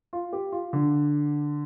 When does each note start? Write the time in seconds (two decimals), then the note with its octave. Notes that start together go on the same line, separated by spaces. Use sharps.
0.13 F4
0.33 G4
0.52 F4
0.73 D3